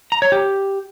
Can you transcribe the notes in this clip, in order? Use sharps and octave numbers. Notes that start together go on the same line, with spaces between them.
A#5
C#5
G4